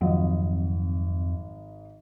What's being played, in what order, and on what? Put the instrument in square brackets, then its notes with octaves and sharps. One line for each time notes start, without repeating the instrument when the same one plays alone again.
[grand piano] G#1 D#5 [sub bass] F2 [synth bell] F3 F#3